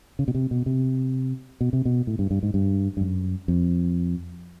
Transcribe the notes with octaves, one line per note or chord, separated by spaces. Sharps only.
C#3
B2
C3
B2
C3
B2
C3
B2
A2
G2
G2
G#2
G2
G2
F#2
F2